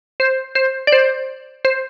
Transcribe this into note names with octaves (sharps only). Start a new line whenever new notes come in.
C5
C5
D5
C5
C5